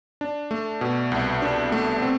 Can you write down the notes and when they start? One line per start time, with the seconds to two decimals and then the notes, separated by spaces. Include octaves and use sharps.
0.21 D4
0.51 A3
0.81 B2
1.12 C2
1.42 D4
1.72 A3
2.02 C4